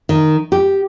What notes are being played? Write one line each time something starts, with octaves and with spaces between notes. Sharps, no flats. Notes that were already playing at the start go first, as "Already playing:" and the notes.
D#3
G4